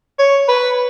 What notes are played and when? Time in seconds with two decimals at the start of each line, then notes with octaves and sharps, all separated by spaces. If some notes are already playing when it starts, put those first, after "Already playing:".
0.19 C#5
0.49 B4